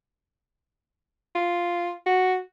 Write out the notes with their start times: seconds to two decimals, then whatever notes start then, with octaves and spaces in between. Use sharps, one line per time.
1.35 F4
2.06 F#4